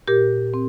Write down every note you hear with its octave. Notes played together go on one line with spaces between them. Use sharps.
A#2 G4 A#4
C4